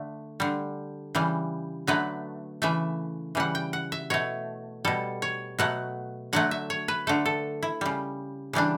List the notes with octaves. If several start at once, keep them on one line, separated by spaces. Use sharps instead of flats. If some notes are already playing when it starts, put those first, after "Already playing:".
Already playing: D3 A3
D3 G3
C#3 E3 G3
D3 F#3 A3 B4
C#3 E3 A3 E5
C#3 E3 G3 F#5
G5
F#5
E5
B2 A3 C#5
B2 G3 A4
C#5
B2 F#3 A3 F#5
D3 F#3 A3 F#5
E5
C#5
B4
D3 A3 A4
A4
E4
C#3 G3
C#3 E3 G3 D4